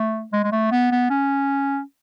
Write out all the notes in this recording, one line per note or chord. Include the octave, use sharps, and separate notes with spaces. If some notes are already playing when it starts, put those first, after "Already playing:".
Already playing: A3
G#3
G#3
A3
B3
B3
C#4